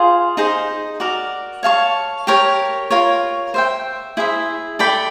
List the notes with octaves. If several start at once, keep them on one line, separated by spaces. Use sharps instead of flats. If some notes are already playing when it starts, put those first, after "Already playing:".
Already playing: F4 G#4 C5 F5
D#4 G#4 C5
F#4 A#4 D5
C#5 F5 A5 C#6
G4 A#4 C#5
F4 A#4 C#5
C5 E5 G5
E4 G#4 C5 E5
A4 D5 G5 B5